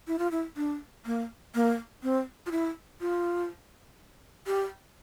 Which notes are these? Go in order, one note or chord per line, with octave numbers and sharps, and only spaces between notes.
E4
F4
E4
D4
A#3
A#3
C4
F4
E4
F4
G4